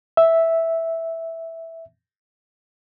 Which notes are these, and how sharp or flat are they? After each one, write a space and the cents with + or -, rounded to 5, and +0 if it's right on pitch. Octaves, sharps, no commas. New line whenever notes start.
E5 -5